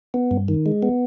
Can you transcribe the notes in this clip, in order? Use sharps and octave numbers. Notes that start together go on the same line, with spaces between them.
B3
G2
D#3
G#3
B3